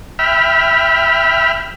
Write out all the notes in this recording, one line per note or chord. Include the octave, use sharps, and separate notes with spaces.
E5 G5 B5 F6